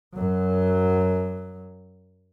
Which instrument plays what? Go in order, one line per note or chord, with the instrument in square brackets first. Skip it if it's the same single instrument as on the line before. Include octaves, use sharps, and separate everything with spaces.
[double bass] F#2 F#3